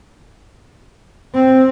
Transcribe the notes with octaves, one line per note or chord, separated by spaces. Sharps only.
C4